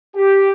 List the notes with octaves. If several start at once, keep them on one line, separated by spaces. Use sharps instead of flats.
G4